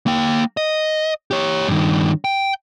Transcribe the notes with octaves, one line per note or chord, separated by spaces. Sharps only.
A#3 G5
D#5
G4 C#5
G2 D#3
G5